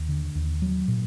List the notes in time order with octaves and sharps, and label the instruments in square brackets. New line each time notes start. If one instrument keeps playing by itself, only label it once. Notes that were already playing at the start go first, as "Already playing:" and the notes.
Already playing: [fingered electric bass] D#2
D3
D#2
F#3
A#2